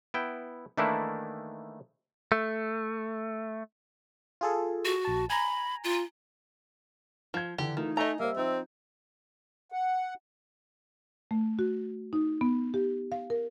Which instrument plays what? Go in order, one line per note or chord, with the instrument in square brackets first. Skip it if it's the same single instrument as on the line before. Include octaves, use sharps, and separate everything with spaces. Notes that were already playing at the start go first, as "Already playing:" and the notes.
[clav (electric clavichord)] B3 E4 G5
D#3 E3 A3 A#3 D4 E4
[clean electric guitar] A3
[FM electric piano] F4 G#4 A4
[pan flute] F#4
[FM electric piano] A#1 A5
[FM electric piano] G#5 A#5 [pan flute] B5
[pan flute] F4
[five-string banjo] F3 [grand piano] G#6 G7
[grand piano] D3 E3 D4 [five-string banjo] G4
[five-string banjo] D#3 [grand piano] E3 A3 F4 [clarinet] D#4
[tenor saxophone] A3 [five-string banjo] D#5 A#5 [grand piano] G#5
[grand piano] G3 C5 [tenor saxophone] A#3 [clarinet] E5
[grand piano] F3 D#4 [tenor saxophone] C4
[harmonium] F#5
[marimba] A3
F#4
D#4
B3
G4
F5
A#4